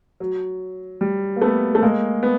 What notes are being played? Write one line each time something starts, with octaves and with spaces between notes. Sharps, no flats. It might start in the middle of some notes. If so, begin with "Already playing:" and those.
F#3
G3
A#3
A3 B3
A3
G#3 A#3
B3